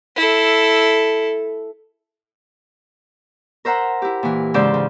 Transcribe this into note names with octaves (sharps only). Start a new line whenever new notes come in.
E4 A4
A#4 C5 E5 F#5 A#5
E4 G4
A#2 E3
G#2 C#3 C5 D5 E5 G6
C#3